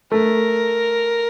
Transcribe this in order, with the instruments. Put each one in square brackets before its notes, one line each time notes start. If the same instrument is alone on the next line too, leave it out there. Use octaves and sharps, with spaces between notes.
[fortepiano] A3 [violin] A#4